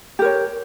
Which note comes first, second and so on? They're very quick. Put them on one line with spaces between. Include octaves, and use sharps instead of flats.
G4 A#4 C#5